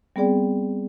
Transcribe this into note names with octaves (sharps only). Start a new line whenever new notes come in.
G3 B3 C4 G#4 D5 G5